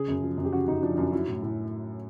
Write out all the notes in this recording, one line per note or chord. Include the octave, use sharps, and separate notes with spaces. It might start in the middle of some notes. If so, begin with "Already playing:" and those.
Already playing: C#3 G#4
F#2
F3
F#2
G4
C#3 F#4
F#2 D#4
F3 D4
F#2 D#4
F#3 E4
A2
A2